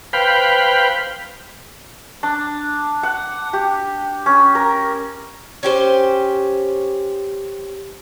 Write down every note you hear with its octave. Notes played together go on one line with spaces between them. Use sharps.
B4 C5 F5 G5 B5
D4
F#5
G4
C#4
A#4
C#4 G4 C5